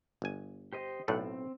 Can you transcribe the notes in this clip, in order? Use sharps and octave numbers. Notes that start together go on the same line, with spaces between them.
G1 G#5
G4 C5 D#5
B1 A2 A3 A4 D5 F#6
C4